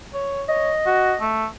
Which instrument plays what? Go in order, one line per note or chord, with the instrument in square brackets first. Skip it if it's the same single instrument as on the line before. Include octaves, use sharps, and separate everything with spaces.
[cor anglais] C#5
[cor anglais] C#5 [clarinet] D#5
[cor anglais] F#4
A3